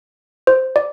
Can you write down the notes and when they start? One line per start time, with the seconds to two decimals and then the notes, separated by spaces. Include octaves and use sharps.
0.47 C5
0.76 D5